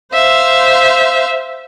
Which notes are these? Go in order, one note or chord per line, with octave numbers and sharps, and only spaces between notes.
C5 E5 F5